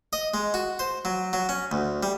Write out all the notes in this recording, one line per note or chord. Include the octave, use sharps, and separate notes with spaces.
D#5
G#3
F#4
C5
F#3
F#3
C#4
D2
G3